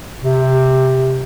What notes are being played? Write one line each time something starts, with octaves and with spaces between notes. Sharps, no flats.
C3